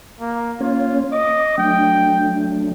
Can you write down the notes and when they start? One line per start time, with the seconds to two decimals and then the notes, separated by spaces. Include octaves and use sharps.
0.20 A#3
0.61 A#3 C#4 F4 C#5
1.12 D#5 D6
1.58 F#3 A3 D4 G5